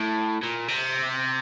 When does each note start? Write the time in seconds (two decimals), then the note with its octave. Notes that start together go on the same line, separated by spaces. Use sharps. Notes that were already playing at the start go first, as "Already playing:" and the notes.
Already playing: A2
0.43 A#2
0.68 C3